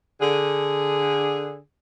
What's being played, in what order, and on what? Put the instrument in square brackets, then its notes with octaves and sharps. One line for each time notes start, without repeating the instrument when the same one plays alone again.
[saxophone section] D3 G#4